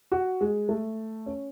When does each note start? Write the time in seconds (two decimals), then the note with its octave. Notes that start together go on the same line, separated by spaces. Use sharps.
0.12 F#4
0.41 G#3
0.69 A3
1.26 C#4